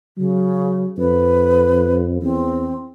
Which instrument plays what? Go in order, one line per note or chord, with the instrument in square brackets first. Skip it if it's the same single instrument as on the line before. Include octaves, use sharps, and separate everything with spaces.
[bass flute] C#3 [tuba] F#3
[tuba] F2 [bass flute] B4
[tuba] E2 [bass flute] C4